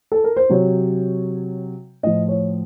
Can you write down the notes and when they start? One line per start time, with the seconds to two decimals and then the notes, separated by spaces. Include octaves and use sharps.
0.12 A4
0.24 A#4
0.37 C5
0.49 C3 F#3 C#5
2.03 A2 F3 D#5
2.29 C#5